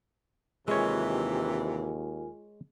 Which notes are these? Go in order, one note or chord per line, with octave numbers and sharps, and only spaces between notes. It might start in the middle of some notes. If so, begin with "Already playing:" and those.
D#2 C3 E3 G#3 F4 A#4 C#5 G#5